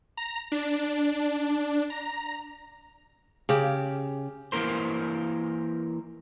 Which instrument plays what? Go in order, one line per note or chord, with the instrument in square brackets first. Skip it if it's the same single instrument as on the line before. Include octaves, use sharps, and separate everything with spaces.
[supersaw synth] A#5
D4
A#5
[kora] C#3 G4
[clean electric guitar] E3 A#3 A#4 C5